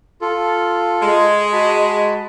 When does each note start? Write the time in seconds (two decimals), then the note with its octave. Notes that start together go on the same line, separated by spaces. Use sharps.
0.21 F4 A4
1.01 G#3
1.53 F#4 A5 B5